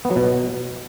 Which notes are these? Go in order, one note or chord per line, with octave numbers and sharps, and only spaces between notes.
B3
F#3
B2